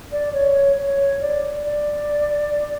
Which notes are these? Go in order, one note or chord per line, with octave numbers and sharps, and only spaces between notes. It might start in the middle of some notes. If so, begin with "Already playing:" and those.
D5
C#5
C#5
D5
D5